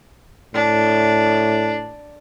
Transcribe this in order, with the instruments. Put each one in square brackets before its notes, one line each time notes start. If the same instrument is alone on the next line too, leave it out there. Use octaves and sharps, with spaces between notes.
[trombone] A2 [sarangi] D4